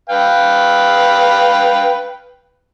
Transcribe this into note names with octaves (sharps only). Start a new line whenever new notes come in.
B4 F5 G5